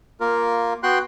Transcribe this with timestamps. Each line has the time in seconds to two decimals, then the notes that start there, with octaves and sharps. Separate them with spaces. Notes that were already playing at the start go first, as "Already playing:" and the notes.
0.20 A#3 F4 A#4
0.83 B3 F#4 G5 C6 F#6